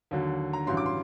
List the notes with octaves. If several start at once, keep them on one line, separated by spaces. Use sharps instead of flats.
D#2 D3 F#3
A#5
A1 G2 F#3 C6
D6
C6